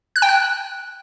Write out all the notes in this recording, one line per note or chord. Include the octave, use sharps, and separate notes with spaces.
F#6
G5
F#6